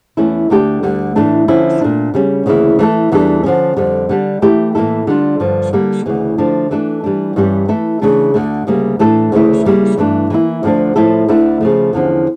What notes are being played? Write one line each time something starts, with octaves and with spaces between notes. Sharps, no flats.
E2 E3 A3 C#4 E4
D2 D3 A3 D4 G4
D2 D3 G3
A2 E3 A3 D4
D3 F3 C#4 E4
A#2 A3 D4
C#3 G3 C#4
D2 C#3 E3 A#3 E4
E3 A3 E4 A4
E2 E3 G3 D4 A4
D3 F3 C#4
F2 D3 G3
D3 G3 D4
E3 A3 E4 G4
A2 E3 A#3 E4 A4
D3 G3 D4 F4
G2 D3 F3
D3 G3 A#3
D2 C#3 E3
D3 F3 A3 D4
E3 A3 D4 A4
E3 G3 D4
G2 E3 G3 C#4 G4
E3 A3 E4 A4
C#3 E3 A3 D4
D2 D3 A3
D2 C#3 G3 A#3
A2 E3 A3 D4 A4
D2 C#3 E3 A3 E4
C#3 G3 A#3 E4
G2 E3 A3 D4
E3 A#3 E4
D2 D3 F3 A3 D4
A2 F3 A3 E4 A4
D2 D3 A3 E4
C#3 F3 A3
E2 D3 F3 C#4